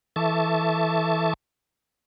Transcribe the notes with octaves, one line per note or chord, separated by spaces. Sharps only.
E3 A4 E5 A5 C#6 D6